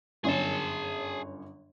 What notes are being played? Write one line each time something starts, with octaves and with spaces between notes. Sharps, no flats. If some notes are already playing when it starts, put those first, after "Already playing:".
G1 F#2 G#4 C#5 A5